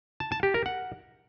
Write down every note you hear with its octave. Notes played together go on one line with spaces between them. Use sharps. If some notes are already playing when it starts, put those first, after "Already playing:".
A5
A5
G4
A#4
F#5